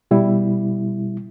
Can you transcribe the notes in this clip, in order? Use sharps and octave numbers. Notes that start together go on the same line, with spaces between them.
B2 G3 E4